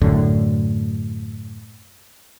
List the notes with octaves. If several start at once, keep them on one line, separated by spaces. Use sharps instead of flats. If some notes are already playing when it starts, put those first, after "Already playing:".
F#2 A2 D3